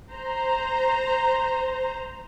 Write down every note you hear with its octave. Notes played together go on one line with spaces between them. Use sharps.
C5 A#5